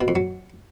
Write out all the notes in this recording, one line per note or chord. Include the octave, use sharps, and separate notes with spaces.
B2
F2
F#3